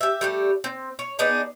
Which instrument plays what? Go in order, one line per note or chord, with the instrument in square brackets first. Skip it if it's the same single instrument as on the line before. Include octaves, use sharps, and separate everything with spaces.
[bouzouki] G4 E5
G3 A3 G4
C4
C#5
B3 D4 D#4 G#4